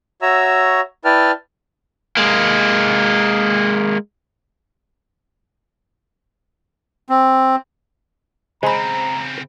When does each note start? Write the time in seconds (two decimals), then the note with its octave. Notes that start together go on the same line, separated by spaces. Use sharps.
0.22 F#4 C#5 E5 A#5 E6
1.05 E4 B4 D5 G5 A5 F6
2.17 G#3 A#3
7.09 C4
8.63 C#3 G#3 C4 C5 A#5 B5